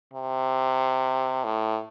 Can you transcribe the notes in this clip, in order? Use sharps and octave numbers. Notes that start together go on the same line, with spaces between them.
C3
A2